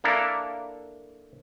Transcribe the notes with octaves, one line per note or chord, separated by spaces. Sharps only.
A#3 D4 E4 A4 A#4